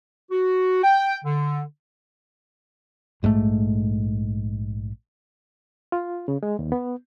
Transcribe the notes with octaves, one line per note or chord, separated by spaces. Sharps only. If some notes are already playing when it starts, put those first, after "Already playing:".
F#4
G5
D3
A#1 G#2 D3 A3
F4
C#3
G#3
D#2
B3